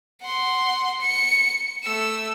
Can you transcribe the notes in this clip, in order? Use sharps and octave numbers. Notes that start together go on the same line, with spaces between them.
F#5 C6
C#7
A3 E6